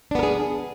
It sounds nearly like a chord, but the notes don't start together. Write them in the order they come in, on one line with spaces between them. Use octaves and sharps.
D4 B3 A#4 G#4